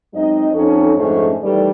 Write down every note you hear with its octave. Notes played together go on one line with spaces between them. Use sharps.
F#2 G#3 C4 D#4 D#5
F2 C4 C#4 D#4 A4
F2 G#2 D3 A3 C#4 G#4
D#3 E3 G3 A3 A4 D5